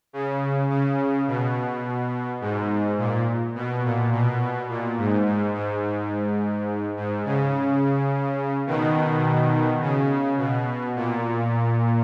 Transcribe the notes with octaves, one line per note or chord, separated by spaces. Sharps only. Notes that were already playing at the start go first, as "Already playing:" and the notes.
C#3
C#3
B2
G#2
A#2
B2
A#2
B2
A#2
G#2
G#2
G#2
G#2
G#2
C#3
B2 D#3
C#3
B2
A#2